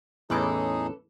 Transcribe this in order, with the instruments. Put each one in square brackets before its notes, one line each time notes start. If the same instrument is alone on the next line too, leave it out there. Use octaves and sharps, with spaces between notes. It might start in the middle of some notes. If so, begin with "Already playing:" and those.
[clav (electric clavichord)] E2 A2 [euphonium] C#4 [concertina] D#4 G#4 [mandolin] A4 B4 D6